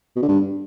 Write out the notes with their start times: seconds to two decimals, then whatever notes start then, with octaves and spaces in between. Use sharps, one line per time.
0.16 B2
0.22 D3
0.28 G2